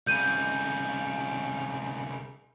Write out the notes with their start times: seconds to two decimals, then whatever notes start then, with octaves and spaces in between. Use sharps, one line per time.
0.07 C2 C#3 G6 D#7